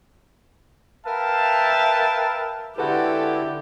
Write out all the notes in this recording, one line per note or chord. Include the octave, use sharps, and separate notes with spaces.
A#4 B4 E5 F5 G5 A5
D3 G#3 E4 F#4 G4 A4 B4 F#5